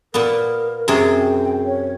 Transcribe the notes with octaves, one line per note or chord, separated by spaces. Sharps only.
A#2 B3 A#4
F#2 C3 G#4
G5
C#5